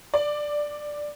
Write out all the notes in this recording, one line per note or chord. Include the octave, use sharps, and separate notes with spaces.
D5